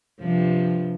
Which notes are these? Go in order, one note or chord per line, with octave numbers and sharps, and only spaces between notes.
G2 C3 F3